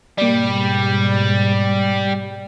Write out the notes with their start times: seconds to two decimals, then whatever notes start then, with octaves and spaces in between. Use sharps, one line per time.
0.18 G#2 B2 G3 A#3 D5